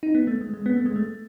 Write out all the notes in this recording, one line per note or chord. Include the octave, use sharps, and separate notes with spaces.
D#4
B3
A3
G#3
G#3
B3
A3
G#3
A3